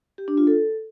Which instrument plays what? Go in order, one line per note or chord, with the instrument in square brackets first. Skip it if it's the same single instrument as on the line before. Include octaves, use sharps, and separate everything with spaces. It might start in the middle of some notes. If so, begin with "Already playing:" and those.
[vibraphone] G4
D4
F4
A4